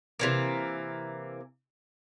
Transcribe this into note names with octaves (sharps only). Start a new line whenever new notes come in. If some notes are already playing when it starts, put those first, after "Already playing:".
C3 E3 A#3